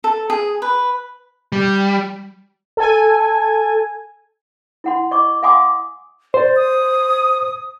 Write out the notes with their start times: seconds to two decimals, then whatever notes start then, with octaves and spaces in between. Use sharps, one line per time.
0.04 A4
0.30 G#4
0.62 B4
1.52 G3
2.77 A4 G#5
4.84 E4 F#5 C6
5.11 D#5 C#6 D6
5.43 F5 F#5 G#5 C6 D6 D#6
6.34 C5 D5
6.56 D#6